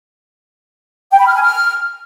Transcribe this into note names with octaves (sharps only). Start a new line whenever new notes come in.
G5
B5
F6
G#5
F6